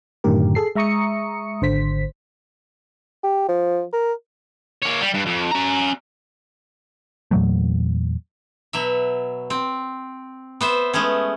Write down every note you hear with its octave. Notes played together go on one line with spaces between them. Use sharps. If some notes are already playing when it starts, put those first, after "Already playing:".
F#2 A2 D3 D#3 G4 A#4
G#4 A4 C7
G#3 E5 A#5 C#6 D#6 C#7
G#1 D3 C5 B6
G4
F3
A#4
A#3 C#5
G3
G2
F2
C#4 A#5
E2 A#2 F#3 A3
B2 F#3 E5
C4
B3 C5 E5
G#3 A3 B3 C#4